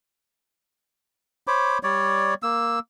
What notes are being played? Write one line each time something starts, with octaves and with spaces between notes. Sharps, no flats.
C5 C#5 B5 D6
G3 C#5 D5
A#3 E6